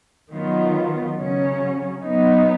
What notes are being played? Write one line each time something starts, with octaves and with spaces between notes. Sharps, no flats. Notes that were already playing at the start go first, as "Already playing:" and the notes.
D#3 F#3 B3 F4
C#3 F#3 C#4
F#3 B3 D#4